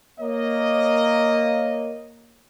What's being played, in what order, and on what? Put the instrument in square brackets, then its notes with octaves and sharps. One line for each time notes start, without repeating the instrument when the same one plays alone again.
[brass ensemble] A#3 C#5 D#5